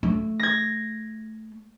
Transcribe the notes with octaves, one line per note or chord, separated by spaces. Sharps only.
A3
G#6 A#6